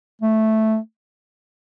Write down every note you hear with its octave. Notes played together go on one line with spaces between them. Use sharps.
A3